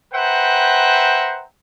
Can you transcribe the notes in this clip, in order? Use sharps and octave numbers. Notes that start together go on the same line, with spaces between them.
B4 C5 E5 F#5 G5 A#5